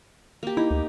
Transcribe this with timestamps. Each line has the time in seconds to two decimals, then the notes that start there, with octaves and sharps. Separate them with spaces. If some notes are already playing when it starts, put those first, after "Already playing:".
0.43 A#3 G4
0.57 D#4 E4
0.71 D2